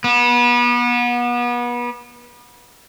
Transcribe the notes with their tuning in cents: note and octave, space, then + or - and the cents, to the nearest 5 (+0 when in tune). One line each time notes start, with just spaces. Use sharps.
B3 -30